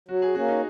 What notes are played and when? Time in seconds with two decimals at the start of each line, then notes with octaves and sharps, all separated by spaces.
0.09 F#3 F#4
0.22 G#4
0.35 A#3 C#4 F#4
0.48 D#4